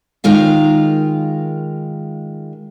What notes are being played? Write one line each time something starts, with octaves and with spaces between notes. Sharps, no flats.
D#3 G#3 F4 A#4 F5